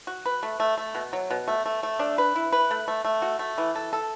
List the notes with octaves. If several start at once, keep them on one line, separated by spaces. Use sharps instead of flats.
F#4
B4
A3
A3
A3
B2
F#3
B2
A3
A3
A3
D4
B4
E4
B4
A3
A3
A3
F#4
A3
E3
A4
A4